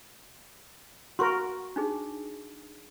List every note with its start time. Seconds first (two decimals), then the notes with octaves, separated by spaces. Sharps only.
1.19 F#4 A#4 C6 C#6
1.76 D4 D#4 G#4